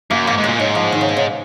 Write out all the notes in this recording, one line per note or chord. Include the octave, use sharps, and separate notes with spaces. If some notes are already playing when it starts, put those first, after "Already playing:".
F#2 A#3
G#2 A#3
G#2
A#2 G#3
G#2 F#3
F3
D#3
C#3
B2
C#3